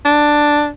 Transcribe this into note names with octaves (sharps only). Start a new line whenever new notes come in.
D4